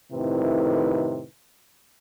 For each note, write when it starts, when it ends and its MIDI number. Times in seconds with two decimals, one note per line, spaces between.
0.12 1.25 41
0.12 1.25 45
0.12 1.25 48
0.12 1.25 51
0.12 1.25 64
0.12 1.25 71